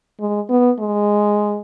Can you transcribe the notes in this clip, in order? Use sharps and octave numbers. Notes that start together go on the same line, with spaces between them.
G#3
B3
G#3